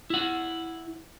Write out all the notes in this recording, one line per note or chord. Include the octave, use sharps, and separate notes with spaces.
E4 F#5